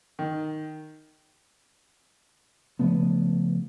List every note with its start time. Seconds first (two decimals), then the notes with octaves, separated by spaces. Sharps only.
0.19 D#3
2.79 C#3 F3 A3 B3